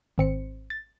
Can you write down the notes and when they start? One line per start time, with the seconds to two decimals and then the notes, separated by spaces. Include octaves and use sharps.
0.18 G#1 C4 C#7
0.70 A6